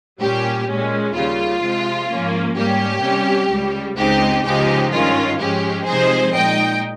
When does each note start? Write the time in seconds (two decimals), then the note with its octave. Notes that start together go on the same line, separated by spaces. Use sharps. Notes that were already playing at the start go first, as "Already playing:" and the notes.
0.20 A#2 G3 C#4 G4
0.67 A#2 G#3 C#4
1.14 D#2 C#3 G3 F4
1.62 C3 F3 G#3
2.08 G#2 F3 A#3 C#4
2.56 G#2 G3 A#3 C#4 G4
3.03 C3 G3 C#4
3.50 C#2 C#3 G3
3.97 C#2 C#3 G#3 C4 D#4 G4
4.45 C#2 C#3 F3 G#3 D#4 G4
4.92 G2 D#3 G#3 C#4 F4
5.39 G#2 F3 G#3 C#4 G4
5.86 C3 F3 G#3 C4 D#4 G#4 C5
6.34 A#2 G#3 D#4 D#5 G5